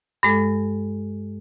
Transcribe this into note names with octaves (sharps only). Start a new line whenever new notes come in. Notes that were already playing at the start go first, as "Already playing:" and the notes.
G2 G#3 A4